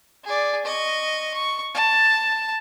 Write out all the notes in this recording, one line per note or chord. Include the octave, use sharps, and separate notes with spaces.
G#4 D5
D#5 C#6
C#6
A5